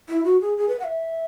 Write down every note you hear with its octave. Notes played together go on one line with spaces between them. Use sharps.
E4
F#4
G#4
G#4
B4
F#5
E5